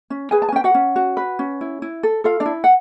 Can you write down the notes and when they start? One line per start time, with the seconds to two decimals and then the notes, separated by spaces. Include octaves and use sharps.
0.10 C#4
0.31 G#4 B4 G#5
0.42 A5
0.49 G#5
0.52 C#4 G5
0.64 F#4 F#5
0.74 C#4
0.96 F#4
1.17 B4
1.39 C#4
1.61 E4
1.82 E4
2.03 A4
2.24 F4 A4 F5
2.40 D4 D5
2.46 E4
2.64 F#5